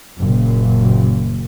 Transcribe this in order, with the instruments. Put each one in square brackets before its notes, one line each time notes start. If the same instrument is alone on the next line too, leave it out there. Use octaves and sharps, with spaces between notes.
[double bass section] F#1 A#2